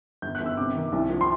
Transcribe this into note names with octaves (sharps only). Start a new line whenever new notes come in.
G1 G6
F#6
G1
E6
C3 D6
D#3
C2
F3
C6